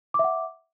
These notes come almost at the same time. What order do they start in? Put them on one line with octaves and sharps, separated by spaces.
D6 E5 F#5